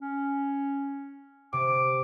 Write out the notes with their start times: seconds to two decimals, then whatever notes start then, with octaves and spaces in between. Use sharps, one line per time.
0.01 C#4
1.53 C3 D6